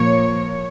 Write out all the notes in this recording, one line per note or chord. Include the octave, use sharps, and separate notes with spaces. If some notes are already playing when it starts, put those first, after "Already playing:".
Already playing: A#2 F3 A#3 C#5